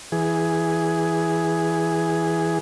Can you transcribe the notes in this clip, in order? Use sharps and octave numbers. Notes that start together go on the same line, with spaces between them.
E3 G#4